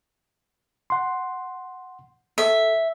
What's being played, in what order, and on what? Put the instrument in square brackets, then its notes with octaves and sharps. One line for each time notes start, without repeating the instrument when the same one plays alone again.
[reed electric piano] F#5 C6
[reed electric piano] A4 [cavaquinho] E5